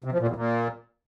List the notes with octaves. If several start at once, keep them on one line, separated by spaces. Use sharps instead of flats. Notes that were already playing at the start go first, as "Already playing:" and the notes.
C3
F3
A#2
E2
A#2